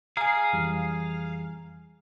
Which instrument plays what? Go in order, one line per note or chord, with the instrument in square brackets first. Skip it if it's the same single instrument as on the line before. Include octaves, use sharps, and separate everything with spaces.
[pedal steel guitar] G#4 F5 [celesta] G#5 A#5
[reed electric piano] F2 E3 G3